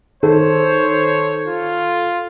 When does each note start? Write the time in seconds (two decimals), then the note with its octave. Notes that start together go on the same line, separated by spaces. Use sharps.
0.23 D#3 A4 C5 C#5
1.47 F4